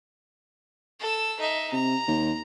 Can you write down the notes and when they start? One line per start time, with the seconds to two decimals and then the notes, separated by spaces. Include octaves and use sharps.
1.00 A4 E6
1.40 D#4 E5
1.72 C3 A#5
2.07 D#2